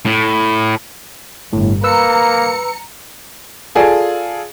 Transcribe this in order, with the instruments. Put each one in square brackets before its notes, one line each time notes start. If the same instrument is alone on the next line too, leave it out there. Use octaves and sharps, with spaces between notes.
[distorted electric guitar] A2
[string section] G1 [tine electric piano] A2
[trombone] A#3 [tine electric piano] B4 E6 [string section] A#5 C#7
[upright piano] F4 G#4 A4 D5